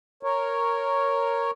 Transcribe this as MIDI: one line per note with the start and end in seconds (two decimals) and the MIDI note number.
0.23 1.51 70
0.23 1.51 73